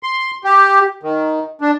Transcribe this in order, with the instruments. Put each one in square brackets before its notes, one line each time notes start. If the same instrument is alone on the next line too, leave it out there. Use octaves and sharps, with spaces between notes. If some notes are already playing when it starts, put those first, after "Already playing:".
[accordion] C6
G4
D#3
D4